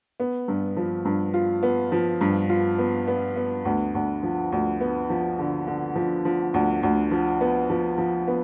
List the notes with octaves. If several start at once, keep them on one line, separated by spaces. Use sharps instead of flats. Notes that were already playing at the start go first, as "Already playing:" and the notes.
B3
G2
F3
G2
F4
B3
F3
G2
F4
B3
B3
B3
D2
D2
F3
D2
B3
F3
D3
D3
F3
F3
D2
D2
F3
B3
F3
F3
B3